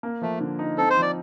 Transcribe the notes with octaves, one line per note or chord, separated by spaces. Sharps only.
A#3
F3 A3
D3
D#4
C4 A4
C5
F3
D5